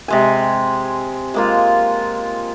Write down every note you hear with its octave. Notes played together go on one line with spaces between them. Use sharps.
C3 G#3 G#5
G#3 A#3 F4